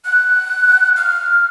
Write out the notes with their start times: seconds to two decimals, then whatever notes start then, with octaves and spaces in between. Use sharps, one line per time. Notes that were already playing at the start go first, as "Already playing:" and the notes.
0.05 F#6
0.96 F6